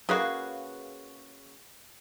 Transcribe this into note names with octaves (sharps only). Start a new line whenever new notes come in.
C#3 A#3 F#4 G#4 B4 F5